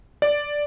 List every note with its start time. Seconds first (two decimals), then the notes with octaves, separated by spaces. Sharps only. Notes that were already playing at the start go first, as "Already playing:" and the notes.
0.22 D5